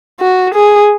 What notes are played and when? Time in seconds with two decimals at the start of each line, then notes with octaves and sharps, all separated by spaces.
0.20 F#4
0.54 G#4